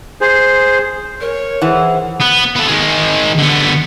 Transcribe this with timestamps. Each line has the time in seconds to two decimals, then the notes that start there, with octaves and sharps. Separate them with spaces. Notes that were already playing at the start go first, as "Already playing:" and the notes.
0.21 G#4 C5
1.21 A#4 C#5
1.62 E3 G#4 C5 F#5
2.20 B3
2.56 B3 A4
2.68 D#3 G#3
3.38 D3 B3